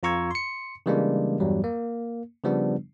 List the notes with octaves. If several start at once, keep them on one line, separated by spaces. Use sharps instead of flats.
F2 F4 A#5 C#6 E6 G#6
C6 C#7
C#3 E3 G3 G#3 A#3 D4
E2 G2 F#3 G3
A#3
C#3 F3 G3 B3 D4